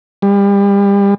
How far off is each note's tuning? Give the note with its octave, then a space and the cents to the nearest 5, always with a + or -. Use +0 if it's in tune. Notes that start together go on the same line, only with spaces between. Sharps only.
G3 +35